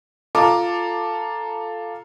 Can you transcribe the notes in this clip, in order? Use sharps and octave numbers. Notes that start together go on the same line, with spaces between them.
F4 A4 A#5 D6